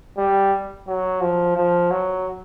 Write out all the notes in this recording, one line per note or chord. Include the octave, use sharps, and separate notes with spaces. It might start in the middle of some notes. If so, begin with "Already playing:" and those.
G3
F#3
F3
F3
F#3